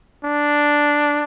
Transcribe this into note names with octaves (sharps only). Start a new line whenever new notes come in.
D4